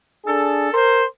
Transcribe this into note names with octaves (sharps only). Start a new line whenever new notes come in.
D4 G#4 A4
A#4 C5